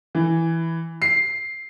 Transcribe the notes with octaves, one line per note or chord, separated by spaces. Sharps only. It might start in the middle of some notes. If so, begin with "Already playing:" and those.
E3
C7